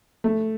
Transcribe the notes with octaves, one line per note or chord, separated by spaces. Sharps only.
A3